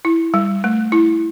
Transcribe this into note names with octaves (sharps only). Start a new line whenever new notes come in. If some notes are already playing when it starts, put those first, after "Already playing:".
E4
G3
A3
E4